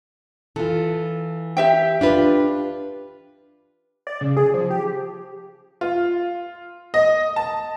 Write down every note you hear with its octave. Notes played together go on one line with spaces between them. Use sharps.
E3 F4 A4
G4 E5 G5
D4 F4 B4
D5
C#3
G#4
F3
G4
F4
D#5
A5